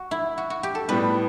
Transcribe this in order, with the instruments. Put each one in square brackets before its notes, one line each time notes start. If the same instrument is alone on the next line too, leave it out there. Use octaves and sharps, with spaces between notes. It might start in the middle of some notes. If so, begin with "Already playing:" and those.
Already playing: [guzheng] F#4
E4
F#4
F#4
G4
A4
[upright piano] A2 G3 B3 [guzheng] B4